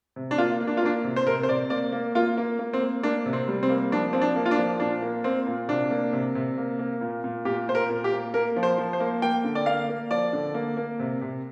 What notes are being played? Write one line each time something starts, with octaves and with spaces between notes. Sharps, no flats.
C3
D4
A#3 F4
A#3
D4
F4
A#3 D4
C3
C5
C3 A#4
C5
C3 D5
A#3 D5
A#3
A#3 F4
A#3
A#3
C4
A#3
A#3 D4
C3
C4
G3
C4
A#3
F3 D4
F3 C4
D4
A#3
F4
D4
F3
A#2 D4
A#3
A#3 C4
A#2
C3 D4
A#3
C3
C3
A#3
A#3
A#2
A#2
A#2 G4
A#2 C5
A#4
A#2
G4
A#3
A#3 A#4
F3
C5
F3
C5
A#3
A#3 G5
D3
D5
A#3 F5
A#3
F3 D5
D3
A#3
A#3
C3
C3